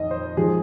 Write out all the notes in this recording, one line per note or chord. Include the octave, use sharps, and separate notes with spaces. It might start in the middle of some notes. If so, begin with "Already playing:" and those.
Already playing: F2 D#3 D#5
C5
G#2 F3 G#4